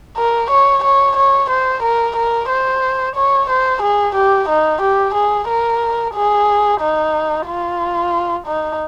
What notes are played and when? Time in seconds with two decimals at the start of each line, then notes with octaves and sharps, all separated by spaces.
0.17 A#4
0.51 C#5
0.83 C#5
1.17 C#5
1.50 C5
1.82 A#4
2.16 A#4
2.49 C5
3.15 C#5
3.49 C5
3.82 G#4
4.15 G4
4.49 D#4
4.81 G4
5.14 G#4
5.48 A#4
6.15 G#4
6.81 D#4
7.47 F4
8.47 D#4